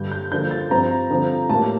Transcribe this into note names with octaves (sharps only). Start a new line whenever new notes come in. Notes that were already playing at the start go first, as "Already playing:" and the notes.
Already playing: G2 D3 G3 G6
G6
D3 F3 A#3 G6
A6
G2 F3 C4 A#5
D3 F3 C4
A2 G3 A#3 A5